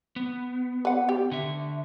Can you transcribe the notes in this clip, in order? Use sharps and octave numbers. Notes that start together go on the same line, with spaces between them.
B3
B4 F#5
G4
D3 E5